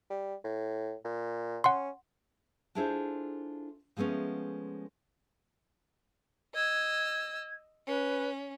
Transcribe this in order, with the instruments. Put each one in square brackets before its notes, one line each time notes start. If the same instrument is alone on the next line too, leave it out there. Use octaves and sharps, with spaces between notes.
[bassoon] G3
A2
A#2
[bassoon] C#4 [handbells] F#5 C6
[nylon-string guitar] D4 E4 F4 G#4 A4 C5
F3 G#3 A3 B3 C#4
[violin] D#5 E6 [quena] G#6
[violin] C#4 [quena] B4